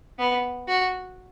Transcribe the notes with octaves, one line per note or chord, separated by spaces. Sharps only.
B3
F#4